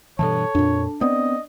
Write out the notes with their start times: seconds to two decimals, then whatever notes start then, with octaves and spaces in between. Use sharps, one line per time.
0.19 G2 B2 E3 A4 C#5 A5
0.55 F2 A#2 D4
1.01 B3 C4 D5 D#5 D#6